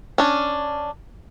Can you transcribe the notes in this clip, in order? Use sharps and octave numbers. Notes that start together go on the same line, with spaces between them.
C#4 D4